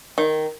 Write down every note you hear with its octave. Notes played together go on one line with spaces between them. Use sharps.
D#3